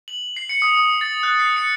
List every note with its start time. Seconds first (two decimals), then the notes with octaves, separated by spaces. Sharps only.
0.08 F#7
0.37 C7
0.49 C#7
0.62 D#6
0.77 D#6
1.01 A6
1.23 F#6
1.40 C7
1.57 C#7